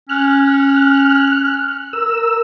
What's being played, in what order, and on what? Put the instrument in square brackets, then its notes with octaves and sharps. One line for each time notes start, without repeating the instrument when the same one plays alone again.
[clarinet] C#4 [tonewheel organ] F6 F#6
[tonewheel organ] A#4 E6